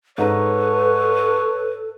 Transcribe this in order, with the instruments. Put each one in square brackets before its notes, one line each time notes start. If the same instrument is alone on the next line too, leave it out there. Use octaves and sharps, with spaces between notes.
[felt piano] G#2 G#4 A#5 [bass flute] A4 [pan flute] B4 [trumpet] C#5